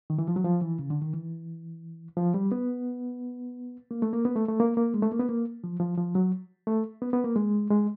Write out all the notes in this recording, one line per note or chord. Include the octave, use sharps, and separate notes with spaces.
D#3
E3
F3
F#3
F3
E3
C#3
D3
D#3
E3
F3
G3
B3
A#3
A3
A#3
B3
A3
A3
A#3
A#3
G#3
A3
A#3
B3
A#3
F3
F3
F3
F#3
A3
B3
B3
A#3
G#3
G#3